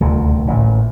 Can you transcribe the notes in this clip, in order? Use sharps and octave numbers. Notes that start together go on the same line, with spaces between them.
D#1 D2 C3
A1 A#2